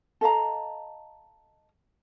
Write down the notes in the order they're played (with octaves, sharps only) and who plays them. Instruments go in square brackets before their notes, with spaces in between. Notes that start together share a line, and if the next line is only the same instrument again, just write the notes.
[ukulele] A4 D#5 F5 A#5